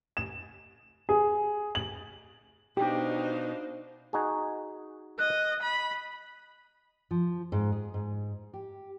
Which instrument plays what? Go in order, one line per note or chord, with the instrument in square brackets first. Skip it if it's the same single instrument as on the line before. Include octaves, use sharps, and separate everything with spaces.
[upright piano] E7
G#4
F#7
[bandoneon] B2 [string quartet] D4 C5 F5 [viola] D#4 [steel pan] G4
[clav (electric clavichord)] D#4 F#4 G#4
[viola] D#5 [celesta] F#6
[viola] B5
[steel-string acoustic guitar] F3
G#2
G#4
G#2
G4